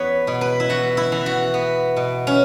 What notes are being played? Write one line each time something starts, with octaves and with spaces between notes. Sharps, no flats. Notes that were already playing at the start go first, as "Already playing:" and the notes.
Already playing: E2 B3 B4 C#5
B2
B4
E4
E3 F#4
E4
E3
F#4
B3
B2
C#4